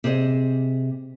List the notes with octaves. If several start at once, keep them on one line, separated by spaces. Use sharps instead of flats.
C3 G#4 C5 D#5